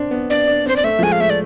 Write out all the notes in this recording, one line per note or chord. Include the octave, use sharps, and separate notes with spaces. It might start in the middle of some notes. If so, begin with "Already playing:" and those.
Already playing: C4 D4
B3
D4 D5
D4
C4 C5
D5
A3 E5
F3
G#3 G#5
F5
A3 E5
D5